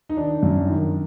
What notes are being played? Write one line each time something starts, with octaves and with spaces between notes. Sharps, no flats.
D#4
D#3 D4
F#2
D#3